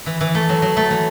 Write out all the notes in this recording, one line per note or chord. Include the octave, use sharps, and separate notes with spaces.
E3
E3
A3
F#3
F#3
A3
E3